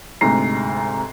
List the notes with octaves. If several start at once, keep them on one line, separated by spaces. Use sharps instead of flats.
D2 G#2 C3 A#5 C7